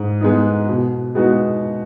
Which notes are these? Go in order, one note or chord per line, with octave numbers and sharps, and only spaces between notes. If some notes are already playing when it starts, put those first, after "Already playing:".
Already playing: G#2
G#3 B3 D#4
B2
G#3 B3 D#4 F#4